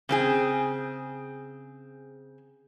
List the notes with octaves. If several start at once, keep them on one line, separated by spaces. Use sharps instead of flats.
C#3 C4 G#4